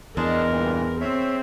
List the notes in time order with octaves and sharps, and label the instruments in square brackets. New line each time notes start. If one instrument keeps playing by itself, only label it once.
[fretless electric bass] E2 [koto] G#3 [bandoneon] D4 G#4 A5 [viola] A#4
[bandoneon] G2 A#2 E3
[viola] C4 [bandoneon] C#5 E5